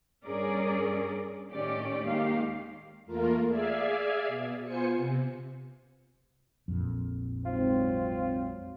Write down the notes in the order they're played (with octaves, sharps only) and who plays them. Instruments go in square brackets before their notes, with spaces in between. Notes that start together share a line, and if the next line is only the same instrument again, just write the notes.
[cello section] G2 C#4 G#4 A#4 D5
A2 D#3 C#4 G4 D5
D#2 D#3 G#3 G4 F5
[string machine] E2 A3 A#3 F4 A#4
G#4 D5 E5 F5 G#5
B2
B3 F4 C5 G#5 C#7
C3
[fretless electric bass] A#1 F2
[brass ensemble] G#2 F#3 C4 [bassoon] F4